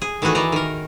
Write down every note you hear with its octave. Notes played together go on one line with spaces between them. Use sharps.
G#4
D#3 E3 A3 F#4 G#4
E3 G#4 D5 A#5
D#3 A#4